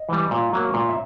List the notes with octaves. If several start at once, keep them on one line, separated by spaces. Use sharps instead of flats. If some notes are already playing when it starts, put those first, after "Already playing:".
Already playing: D#5
E3 G3
A#2
F#3 A#3
A#2 F5
E5